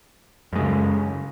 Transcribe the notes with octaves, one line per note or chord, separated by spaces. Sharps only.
F#2 C#3 G#3